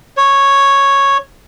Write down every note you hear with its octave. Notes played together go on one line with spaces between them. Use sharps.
C#5